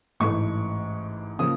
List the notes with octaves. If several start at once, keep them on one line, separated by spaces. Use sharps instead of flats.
A1 G#2 E3 A3 C#6
C#3 F3 A#3 D#6